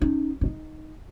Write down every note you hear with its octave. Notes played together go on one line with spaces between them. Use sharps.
C#4 D#4
G2 D#4